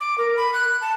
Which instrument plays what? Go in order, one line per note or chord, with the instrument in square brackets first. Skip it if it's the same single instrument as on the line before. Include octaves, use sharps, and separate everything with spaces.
[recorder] D6
A#4
B5
F#6
A5